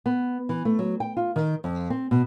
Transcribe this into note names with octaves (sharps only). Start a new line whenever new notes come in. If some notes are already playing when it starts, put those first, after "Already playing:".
B3
E3
A3
F#3
G5
F4
D#3
F2
C4
B2